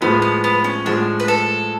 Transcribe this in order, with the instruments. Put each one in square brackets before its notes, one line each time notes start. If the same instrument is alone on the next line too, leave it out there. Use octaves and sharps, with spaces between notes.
[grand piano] A2 F3 G#3 [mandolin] B3
[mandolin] B3
B3
C#4
[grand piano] A2 F3 G#3 [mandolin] D4
[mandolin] B4
A4